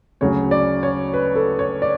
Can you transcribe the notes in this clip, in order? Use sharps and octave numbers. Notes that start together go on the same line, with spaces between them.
D2 C#3 F#3 C#5
D5
C#5
B4
A4
C#5
D5